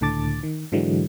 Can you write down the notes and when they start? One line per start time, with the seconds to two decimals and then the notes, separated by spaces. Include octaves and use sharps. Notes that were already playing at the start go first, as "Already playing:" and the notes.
0.01 C#2 A2 D3 A5 D6 A6
0.43 D#3
0.72 G#2 D3 E3 F#3 G#3